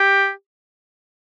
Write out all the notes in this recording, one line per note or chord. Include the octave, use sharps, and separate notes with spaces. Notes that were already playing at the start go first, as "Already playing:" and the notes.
Already playing: G4